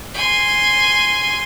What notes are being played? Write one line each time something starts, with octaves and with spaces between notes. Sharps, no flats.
G#5 C6